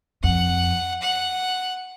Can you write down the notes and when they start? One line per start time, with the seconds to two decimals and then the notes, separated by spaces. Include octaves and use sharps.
0.23 F2 F#5
1.02 F#5